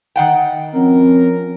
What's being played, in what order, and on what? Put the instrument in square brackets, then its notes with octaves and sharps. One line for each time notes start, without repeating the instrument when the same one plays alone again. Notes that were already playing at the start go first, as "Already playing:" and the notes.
[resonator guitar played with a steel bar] D#3 F#5 G5
[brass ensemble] F3 C#4 A#4 [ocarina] C4